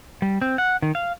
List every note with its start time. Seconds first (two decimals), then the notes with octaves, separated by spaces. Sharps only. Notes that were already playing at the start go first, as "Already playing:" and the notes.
0.22 G3
0.42 C4
0.58 F#5
0.82 D#3
0.95 F5